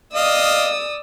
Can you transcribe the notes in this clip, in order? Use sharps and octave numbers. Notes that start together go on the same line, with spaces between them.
D5 D#5 F5 D#6 E6